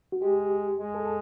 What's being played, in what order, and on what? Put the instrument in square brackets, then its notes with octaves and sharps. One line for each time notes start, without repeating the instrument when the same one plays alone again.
[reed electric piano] F#4
[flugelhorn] G#3 [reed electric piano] G4
[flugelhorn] G#3
[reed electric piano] A4
A4